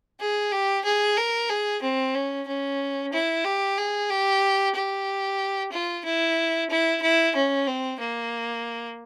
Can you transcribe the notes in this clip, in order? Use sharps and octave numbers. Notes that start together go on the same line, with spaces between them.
G#4
G4
G#4
A#4
G#4
C4
C#4
C#4
E4
G4
G#4
G4
G4
F4
E4
E4
E4
C#4
C4
A#3